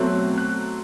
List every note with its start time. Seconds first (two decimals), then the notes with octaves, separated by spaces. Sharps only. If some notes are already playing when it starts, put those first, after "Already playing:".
Already playing: B2 F#3 A3 C4 F#6
0.38 F#6